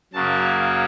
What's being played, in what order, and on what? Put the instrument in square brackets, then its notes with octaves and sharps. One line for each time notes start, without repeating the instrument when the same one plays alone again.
[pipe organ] F#2 C#3 F#3 A#3 A5